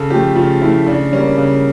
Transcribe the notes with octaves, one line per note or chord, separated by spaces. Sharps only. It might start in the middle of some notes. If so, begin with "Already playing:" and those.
Already playing: C#3 A4
F3 A3 G4
C#3 F4
F3 A3 E4
C#3 D4
G3 A#3 C#4
C#3